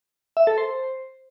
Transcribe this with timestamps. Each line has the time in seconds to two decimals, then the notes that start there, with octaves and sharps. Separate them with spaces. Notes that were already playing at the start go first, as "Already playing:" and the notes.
0.37 E5
0.47 A4
0.58 C5